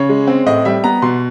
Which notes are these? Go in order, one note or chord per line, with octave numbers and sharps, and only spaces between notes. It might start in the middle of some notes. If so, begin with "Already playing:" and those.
Already playing: C#3 C#5
G#3
C4
A2 D#5
G3 E5
B3 A#5
B2 C6